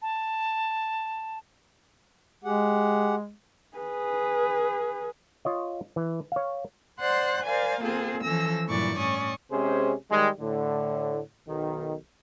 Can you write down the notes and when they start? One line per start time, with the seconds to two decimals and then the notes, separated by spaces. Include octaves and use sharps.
0.02 A5
2.44 G#3 G4 G#4 F#5
3.77 G#4 B4
5.45 F4 C#5 D#5
5.96 E3
6.32 C#5 F5
6.99 C5 D5 F#5 C6 F#6
7.43 A#4 C5 D5 F5 G#5
7.81 A#3 C4 F4 G#4 A4
8.23 E3 F3 C#4 A4 E6 A#6
8.67 G2 A#2 E3 F#3 D5 C#6
8.98 A2 C#4 D5 C#6 D#6
9.52 C3 G#3 C#4 G#4 C5
10.11 D#3 G3 G#3
10.39 A2 D3
11.48 B1 D#3